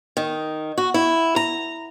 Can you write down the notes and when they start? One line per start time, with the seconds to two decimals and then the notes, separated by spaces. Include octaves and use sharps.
0.17 D#3
0.78 F#4
0.94 E4
1.36 A#5